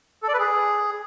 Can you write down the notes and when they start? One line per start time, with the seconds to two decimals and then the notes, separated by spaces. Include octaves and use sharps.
0.23 A4
0.28 D5
0.34 B4
0.39 G#4